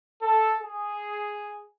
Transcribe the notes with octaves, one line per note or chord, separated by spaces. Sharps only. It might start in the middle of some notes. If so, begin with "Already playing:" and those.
A4
G#4